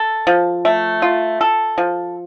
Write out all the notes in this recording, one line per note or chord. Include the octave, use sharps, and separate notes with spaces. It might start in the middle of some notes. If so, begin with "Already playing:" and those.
Already playing: A4
F3
A3
F4
A4
F3